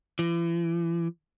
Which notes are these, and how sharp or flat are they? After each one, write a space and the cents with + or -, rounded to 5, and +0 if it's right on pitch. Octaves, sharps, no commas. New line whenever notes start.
E3 +40